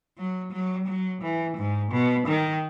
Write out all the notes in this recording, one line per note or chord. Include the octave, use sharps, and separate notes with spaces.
F#3
F#3
F#3
E3
G#2
B2
D#3